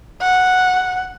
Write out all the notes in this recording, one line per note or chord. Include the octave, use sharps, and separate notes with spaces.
F#5